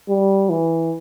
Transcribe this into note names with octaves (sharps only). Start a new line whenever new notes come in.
G3
E3